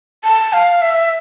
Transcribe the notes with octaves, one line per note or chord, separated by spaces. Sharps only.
A5
F5
E5